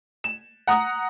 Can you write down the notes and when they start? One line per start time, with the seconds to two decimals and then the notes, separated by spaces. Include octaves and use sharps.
0.24 E7
0.67 F#5 A#5 D#6